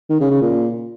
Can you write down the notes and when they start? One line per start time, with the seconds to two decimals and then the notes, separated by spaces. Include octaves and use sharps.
0.10 D#3
0.20 C#3
0.31 C#3
0.41 A#2